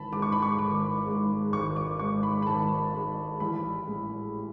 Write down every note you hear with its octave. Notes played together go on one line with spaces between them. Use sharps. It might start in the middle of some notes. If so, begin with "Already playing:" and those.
Already playing: G#1 A5 B5
G#2 G#3 D6
C#6
B5
C#6
G#1 D6
G#2 G#3
G#1 C#6
D6
G#2 G#3 C#6
B5
B5
G#1 A5
G#2 G#3
A1 B5
A2 G#3